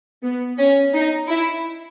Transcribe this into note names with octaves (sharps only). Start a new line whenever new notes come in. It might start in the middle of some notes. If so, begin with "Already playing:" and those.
B3
C#4
D#4
E4